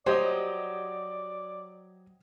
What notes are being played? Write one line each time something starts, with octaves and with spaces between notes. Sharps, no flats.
F#3 G4 C5 D5 D#5